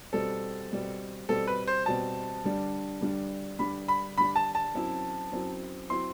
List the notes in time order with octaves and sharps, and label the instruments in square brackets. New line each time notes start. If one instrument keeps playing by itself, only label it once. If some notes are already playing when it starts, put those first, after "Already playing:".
[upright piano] B2 G3 C4 [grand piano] A4
[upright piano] B2 G3 C4
[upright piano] B2 G3 C4 [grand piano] A4
[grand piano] B4
C5
[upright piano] B2 G3 C4 [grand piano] A5
[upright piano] G2 D3 G3 D4
G2 D3 G3 D4
[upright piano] G2 D3 G3 D4 [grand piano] B5
[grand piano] B5
[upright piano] G2 D3 G3 D4 [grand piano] B5
[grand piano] A5
A5
[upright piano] F#2 F#3 C4 E4
F#2 F#3 C4 E4
[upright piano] F#3 C4 E4 [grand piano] C6